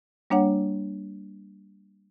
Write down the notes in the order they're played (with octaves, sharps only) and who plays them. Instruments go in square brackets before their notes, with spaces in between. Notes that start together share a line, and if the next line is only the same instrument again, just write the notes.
[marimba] G3 A#3 D4 C#5 F#5